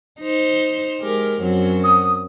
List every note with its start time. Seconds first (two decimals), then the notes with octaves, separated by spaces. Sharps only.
0.20 D#4 C5
1.01 G#3 G4 A#4
1.41 F#2 F#3 C4
1.84 D#6